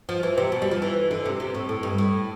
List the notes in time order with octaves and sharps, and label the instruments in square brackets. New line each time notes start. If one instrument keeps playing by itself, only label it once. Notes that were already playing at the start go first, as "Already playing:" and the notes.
[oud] F3
E3
C3
B2
G3
F3
E3
D3
C3
C3
A2
A2
G2
A2